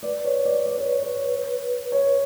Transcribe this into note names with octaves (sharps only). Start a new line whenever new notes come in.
B4 D5
C#5
D5
D5
C#5
C#5
C#5